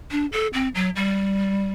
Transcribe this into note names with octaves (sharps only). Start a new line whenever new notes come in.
D4
A4
C4
F#3
G3